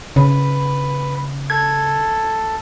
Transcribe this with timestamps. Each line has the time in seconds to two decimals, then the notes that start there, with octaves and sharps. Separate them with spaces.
0.16 C#3 B4
1.50 A4 G#6